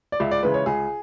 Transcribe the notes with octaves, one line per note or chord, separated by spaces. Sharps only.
D5
C#2 E5
D5
C#3 E3 G#3 B4
C#5
C#2 G#4